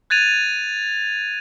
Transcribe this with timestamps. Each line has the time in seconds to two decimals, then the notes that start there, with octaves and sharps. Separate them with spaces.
0.10 F#6 G#6 A6 D#7 F7